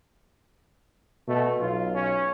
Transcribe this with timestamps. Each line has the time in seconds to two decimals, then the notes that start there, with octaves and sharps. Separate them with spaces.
1.28 B2 A3
1.60 B1 F4
1.95 C#4